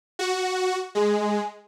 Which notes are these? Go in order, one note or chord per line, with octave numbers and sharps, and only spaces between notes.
F#4
G#3